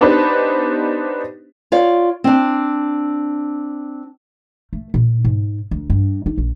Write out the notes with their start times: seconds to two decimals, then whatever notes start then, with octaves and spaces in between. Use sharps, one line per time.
0.01 B3 D4 D#4 G4 B4 C5
1.72 F4 C#5 D5 F5
2.24 C4 D4
4.73 A3
4.94 A#2
5.25 G#2
5.71 D2
5.90 G2
6.26 D#4
6.38 A#1